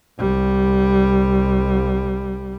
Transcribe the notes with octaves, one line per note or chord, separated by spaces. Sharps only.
C2 G3